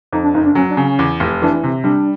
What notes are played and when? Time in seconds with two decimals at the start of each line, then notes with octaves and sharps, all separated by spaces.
0.12 F2 D#4
0.24 D4
0.34 F#1 D#4
0.45 D4
0.55 F#3 C#4
0.70 D4
0.77 C#3
0.84 C#4
0.99 E2
1.20 F1
1.42 E3 D4
1.64 C3
1.84 G3 D4